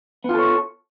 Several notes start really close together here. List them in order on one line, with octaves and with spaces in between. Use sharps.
B3 F4 A4 C#5